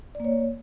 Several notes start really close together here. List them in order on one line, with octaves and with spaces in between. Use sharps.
D5 A#3 C#5